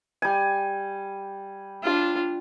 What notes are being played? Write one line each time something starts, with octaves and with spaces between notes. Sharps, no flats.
G3 G#5
D4 F4